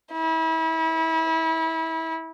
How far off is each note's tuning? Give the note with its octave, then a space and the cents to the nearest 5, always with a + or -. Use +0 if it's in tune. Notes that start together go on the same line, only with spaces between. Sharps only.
E4 -30